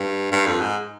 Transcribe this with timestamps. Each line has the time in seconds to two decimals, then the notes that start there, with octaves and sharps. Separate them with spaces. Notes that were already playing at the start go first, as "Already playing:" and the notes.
Already playing: G2
0.32 G2
0.46 F2
0.61 G#2